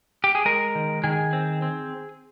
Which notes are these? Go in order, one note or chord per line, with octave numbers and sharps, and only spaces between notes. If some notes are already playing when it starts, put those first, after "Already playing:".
G4
G#4
G#3 A#4
D#3
D#3 G#4
C4
C4